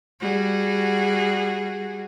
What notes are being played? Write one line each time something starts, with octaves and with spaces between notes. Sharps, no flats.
G3 F#4 G#4